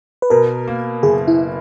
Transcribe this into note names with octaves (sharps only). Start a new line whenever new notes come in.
B4
B2 A#4
A#3
F#1 G#4
E4